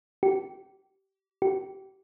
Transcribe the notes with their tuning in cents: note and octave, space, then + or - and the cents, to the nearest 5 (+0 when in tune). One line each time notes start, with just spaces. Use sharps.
G4 -25
G4 -30